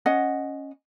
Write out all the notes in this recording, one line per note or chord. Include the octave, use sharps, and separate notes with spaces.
C#4 D#5 F#5